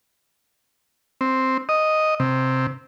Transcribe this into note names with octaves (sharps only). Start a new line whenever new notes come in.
C4
D#5
C3